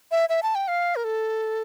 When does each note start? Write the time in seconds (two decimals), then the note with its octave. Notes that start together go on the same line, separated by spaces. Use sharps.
0.11 E5
0.29 E5
0.43 A5
0.55 G5
0.68 F5
0.96 A#4
1.04 A4